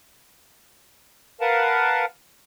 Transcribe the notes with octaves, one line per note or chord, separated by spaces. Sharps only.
A#4 B4 F5 F#5 A5